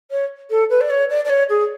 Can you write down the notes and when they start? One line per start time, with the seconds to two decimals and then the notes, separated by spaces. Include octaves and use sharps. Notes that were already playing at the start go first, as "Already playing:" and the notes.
0.11 C#5
0.50 A4
0.69 B4
0.80 D5
0.90 C#5
1.09 D5
1.24 D5
1.29 C#5
1.49 G#4